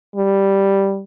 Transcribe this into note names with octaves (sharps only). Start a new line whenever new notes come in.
G3